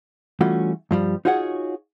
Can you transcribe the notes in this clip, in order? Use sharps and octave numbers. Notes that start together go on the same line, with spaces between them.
E3 G3 A3 C#4 F4 F#4
G2 F3 G3
D#4 F4 F#4 G#4 C#5 F#5